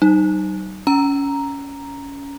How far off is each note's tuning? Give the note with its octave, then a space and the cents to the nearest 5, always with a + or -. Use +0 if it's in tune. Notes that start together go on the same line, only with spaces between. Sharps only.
G3 -45 D#4 -15
C#4 +15 A#5 +0